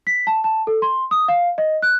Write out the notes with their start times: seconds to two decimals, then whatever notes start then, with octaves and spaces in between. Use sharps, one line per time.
0.07 B6
0.27 A5
0.44 A5
0.67 A4
0.82 C6
1.11 D#6
1.28 F5
1.58 D#5
1.82 F#6